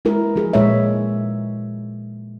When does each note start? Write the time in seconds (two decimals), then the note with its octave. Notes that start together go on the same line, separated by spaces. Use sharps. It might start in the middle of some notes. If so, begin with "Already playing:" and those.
0.05 G#3 E4 A#4
0.36 F3 F4 G#4
0.53 A#2 G#3 D#4 F4 C#5 E5